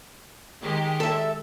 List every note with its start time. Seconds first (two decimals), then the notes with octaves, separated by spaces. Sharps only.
0.61 D#3 G#3 G4
1.00 A4 E5